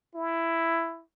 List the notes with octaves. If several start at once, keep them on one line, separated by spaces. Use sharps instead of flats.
E4